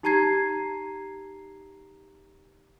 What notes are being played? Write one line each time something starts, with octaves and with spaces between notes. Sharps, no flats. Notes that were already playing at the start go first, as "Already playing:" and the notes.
D#4 G4 A5 A#5 G#6 C7